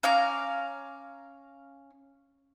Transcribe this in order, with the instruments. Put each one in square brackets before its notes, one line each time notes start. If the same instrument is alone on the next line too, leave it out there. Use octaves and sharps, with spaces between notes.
[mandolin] C#4 F5 A#5 D6